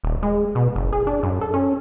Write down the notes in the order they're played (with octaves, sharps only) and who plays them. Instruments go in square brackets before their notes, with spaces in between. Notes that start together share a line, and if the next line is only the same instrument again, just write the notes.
[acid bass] D#1
G#3
B2
F#1
G#4
D4
F#2
A4
C#4